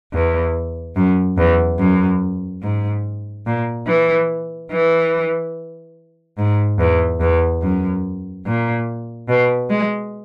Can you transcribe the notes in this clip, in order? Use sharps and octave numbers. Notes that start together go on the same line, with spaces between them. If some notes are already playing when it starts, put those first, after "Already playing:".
E2
F#2
E2
F#2
G#2
A#2
E3
E3
G#2
E2
E2
F#2
A#2
B2
G#3